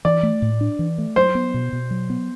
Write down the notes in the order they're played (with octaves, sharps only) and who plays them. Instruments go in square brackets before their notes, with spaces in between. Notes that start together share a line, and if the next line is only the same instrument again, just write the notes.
[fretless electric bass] E3 [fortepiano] D5
[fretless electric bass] A3
A2
D4
E3
A3
[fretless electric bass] F#3 [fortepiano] C5
[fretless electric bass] B3
B2
B2
F#3
B3